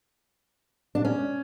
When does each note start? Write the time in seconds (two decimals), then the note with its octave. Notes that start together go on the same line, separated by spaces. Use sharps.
0.95 D4
1.05 C#4